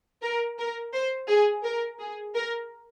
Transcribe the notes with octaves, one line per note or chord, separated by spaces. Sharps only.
A#4
A#4
C5
G#4
A#4
G#4
A#4